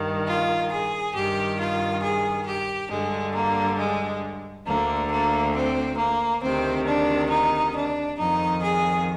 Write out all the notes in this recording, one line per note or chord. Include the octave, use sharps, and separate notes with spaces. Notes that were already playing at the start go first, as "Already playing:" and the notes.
Already playing: G2 D#3
F4
G#4
G2 D#3 G4
F4
G#4
G4
G2 D3 G#3
A#3
G#3
D2 D3 A#3
A#3
C4
A#3
D2 C3 D#3 C4
D4
D#4
D4
F2 D#3 D#4
G#4